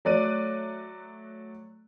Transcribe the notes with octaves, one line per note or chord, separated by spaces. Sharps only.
F#3 A3 D5 F#6 D#7